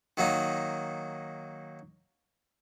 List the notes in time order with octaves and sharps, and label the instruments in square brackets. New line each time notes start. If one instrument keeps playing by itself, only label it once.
[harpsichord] D#3 F#3 A#3 D#4